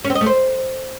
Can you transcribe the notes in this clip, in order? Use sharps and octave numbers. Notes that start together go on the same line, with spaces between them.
C#4
C4
D#5
A3
C5